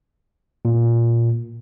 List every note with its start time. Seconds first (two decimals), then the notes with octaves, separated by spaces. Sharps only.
0.65 A#2